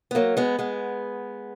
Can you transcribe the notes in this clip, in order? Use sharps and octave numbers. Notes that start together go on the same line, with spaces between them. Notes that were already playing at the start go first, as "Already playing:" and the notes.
B3
F#3 A#3
G#3 B3
G#3 B3